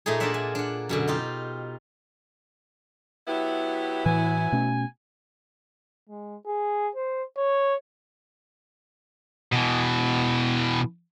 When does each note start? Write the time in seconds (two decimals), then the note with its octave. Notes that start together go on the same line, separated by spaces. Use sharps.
0.06 A#2 A3 A#3 D#4 G#4
0.20 A#3 D4 F4 D5 E5 F#5
0.34 G#5
0.55 D4 F#5
0.89 F#2 B2 D3
1.08 D#4 F4 G4
3.28 F#3 B3 E4 G4
4.06 A2 E3 G#5
4.52 B2 A3 C#4
6.09 G#3
6.46 G#4
6.96 C5
7.37 C#5
9.52 B2 E3